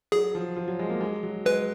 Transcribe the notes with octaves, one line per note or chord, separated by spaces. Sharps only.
F#3 G#4
F3
F3
F#3
G#3
A#3
G#3
F#3
G#3 B4